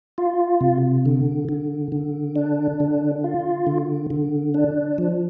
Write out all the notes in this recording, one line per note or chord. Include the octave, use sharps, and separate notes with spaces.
F4
C3
D3
D3
D3
D4
D3
F4
D3
D3
D4
F3